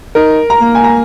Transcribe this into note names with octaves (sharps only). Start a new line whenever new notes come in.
D#4 A#4
A#5
A#3
G#5
A#5